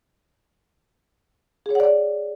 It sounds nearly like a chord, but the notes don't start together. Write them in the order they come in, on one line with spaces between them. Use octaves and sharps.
G#4 C#5 F#5 D5